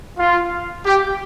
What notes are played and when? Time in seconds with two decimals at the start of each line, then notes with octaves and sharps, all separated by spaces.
0.18 F4
0.85 G4